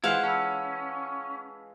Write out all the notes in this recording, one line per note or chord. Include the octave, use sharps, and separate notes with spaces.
E3 G#3 E4 F4 C5 F5 F#5
C#4 A5 B5 E6